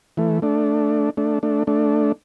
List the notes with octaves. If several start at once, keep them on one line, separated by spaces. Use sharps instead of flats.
E3 A3
A3 D4
A3 D4
A3 D4
A3 D4